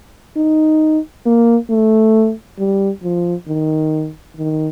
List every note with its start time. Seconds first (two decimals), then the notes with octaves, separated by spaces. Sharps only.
0.37 D#4
1.26 A#3
1.70 A3
2.59 G3
3.03 F3
3.48 D#3
4.37 D#3